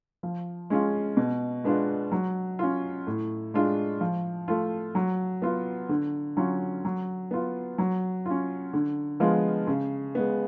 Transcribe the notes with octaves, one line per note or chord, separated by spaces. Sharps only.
F3
G#3 C#4 F4
B2
G#3 B3 D4 F4
F#3
C#4 F4
A2
G#3 D4 F4
F3
A3 F4
F#3
B3 F4
D3
F#3 C#4 F4
F#3
B3 F4
F#3
C#4 F4
D3
F3 G#3 B3 F4
C#3
G#3 B3